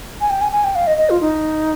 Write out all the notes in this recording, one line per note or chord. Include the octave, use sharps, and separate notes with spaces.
G#5
G5
G#5
G#5
G5
F5
D#5
D#5
F4
D#4